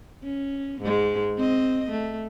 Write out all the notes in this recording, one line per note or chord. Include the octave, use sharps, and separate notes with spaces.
C#4
G#2 G#3
C4 D#5
A3